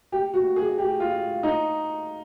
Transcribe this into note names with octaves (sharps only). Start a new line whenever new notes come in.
G4
F#4
G#4
G4
F4
D#4